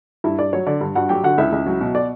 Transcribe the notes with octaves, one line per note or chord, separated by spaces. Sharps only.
G2 E4 E5
G2 D5
F#3 C#5
D3 D5
G2
G2 F#4 F#5
F#3 G4 G5
D3 F#4 F#5
C#2 E4 E5
C#2
F#3
B2
D5